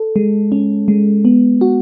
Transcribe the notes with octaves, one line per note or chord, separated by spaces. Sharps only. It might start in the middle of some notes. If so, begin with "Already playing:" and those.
Already playing: A4
G#3
C#4
G#3
B3
F#4